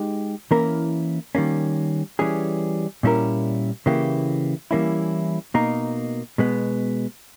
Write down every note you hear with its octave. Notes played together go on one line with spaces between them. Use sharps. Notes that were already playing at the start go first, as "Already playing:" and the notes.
Already playing: G#3 D#4 G4
E3 A#3 C#4 E4 A#4
D#3 G3 A#3 C#4
E3 G3 C#4 G#4
A#2 G3 C#4 E4 A#4
C#3 E3 A#3 E4 G4
E3 G3 A#3 C#4 E4
B2 A#3 D#4 A#4
B2 G#3 B3